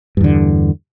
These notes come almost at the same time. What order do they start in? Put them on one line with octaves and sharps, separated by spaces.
G2 E2 D3